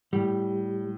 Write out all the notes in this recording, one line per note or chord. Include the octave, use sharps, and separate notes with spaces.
A2 G3